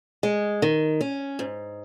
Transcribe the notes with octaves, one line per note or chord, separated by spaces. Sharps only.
G#3
D#3
C#4
G#2